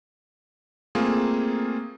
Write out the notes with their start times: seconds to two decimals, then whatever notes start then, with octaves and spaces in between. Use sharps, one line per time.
0.95 A3 A#3 C4 F4 G#4